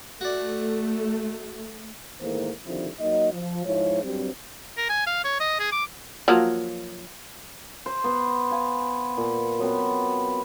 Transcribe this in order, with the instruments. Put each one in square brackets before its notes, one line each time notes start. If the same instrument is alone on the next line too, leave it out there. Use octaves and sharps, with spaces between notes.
[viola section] A3 [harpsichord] F#4 D5
[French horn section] A2 D#3 E3 G#3 A#3 C5
D3 D#3 F3 G3 C4 E4
F#3 A#3 D#4 D#5
F3
G#2 F3 G#3 E4 C#5
G2 F#3 G3 C4
[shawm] A#4
G#5
F5
C#5
D#5
G#4
D6
[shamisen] F3 F#3 A#3
[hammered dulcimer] C5
B3 C5
F5 G#5
A#2
F#3 B3 C4